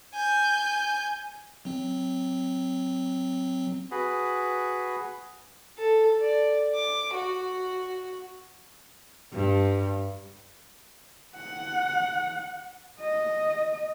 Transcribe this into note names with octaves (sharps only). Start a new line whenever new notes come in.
G#5 G6
F#3 C4
F#4 G#4 B4
A4
D5
D6
F#4
G2
F#5
D#5